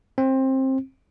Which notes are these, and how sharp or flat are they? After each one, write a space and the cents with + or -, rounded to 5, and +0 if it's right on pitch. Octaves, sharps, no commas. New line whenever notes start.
C4 +20